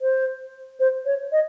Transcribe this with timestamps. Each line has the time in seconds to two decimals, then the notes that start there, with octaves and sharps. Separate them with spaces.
0.02 C5
0.80 C5
1.06 C#5
1.32 D#5